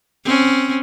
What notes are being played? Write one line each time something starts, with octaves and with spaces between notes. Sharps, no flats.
C4 C#4